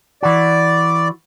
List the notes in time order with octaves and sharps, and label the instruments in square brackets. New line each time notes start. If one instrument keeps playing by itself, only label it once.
[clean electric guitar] E3 F#4 [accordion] D5